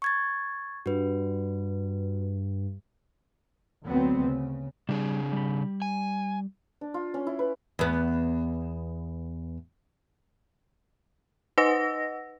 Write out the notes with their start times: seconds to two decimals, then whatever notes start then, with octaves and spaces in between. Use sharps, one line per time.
0.02 C#6 G#6 A6
0.86 G2 F#4 B4
3.84 D2 F#3 B3 C4
4.20 C#3
4.89 C#3 G3 D4 G#4
5.33 G3 B5
5.82 G#5
6.81 D4
6.94 F4
7.14 C#4
7.27 E4
7.39 B4
7.79 E2 B3
11.58 D#4 B4 D#5 F#5 E6 A#6